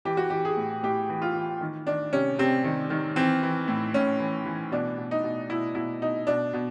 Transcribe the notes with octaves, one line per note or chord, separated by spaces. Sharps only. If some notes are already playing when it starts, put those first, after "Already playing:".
E3 G4
F#4
E3 G4
G#4
A2
A2 G4
E3
F4
E3
D#3
D#3 D4
C3 C#4
C3 C4
D#3
D#3
E3 C4
E3
A2
A2 C#4
E3
E3
B2 D4
B2
D#4
B2
B2 E4
B2 E4
B2 D#4
B2 D4
B2